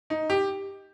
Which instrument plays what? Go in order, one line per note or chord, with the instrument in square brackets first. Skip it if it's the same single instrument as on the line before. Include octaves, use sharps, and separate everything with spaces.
[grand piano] D#4
G4